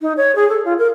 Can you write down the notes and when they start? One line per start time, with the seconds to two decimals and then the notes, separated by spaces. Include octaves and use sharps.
0.01 D#4
0.17 C#5
0.36 G#4
0.49 A4
0.65 F4
0.78 A#4